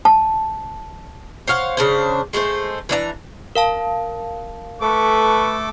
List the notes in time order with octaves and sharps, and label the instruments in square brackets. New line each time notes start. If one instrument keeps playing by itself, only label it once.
[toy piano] A5
[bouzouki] C5 C#5 F5 F#5
C#3 D4 C5
G#3 A3 A4 C5
E3 D4 C#5 A#5
[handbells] A#4 F5 A5
[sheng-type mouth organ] A3 A4 D6 [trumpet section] B4 C#6